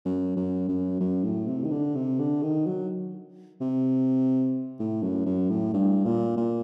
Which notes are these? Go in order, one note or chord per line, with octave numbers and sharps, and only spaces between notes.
F#2
F#2
F#2
F#2
A2
C3
D#3
D3
C3
D3
D#3
F#3
C3
A2
F#2
F#2
A2
G2
A#2
A#2